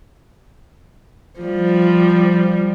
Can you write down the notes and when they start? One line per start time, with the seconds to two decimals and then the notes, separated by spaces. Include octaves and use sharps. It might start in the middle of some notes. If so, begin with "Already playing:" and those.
1.40 F3 G3